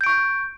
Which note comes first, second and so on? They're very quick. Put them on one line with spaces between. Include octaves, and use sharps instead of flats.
G6 D7 C#6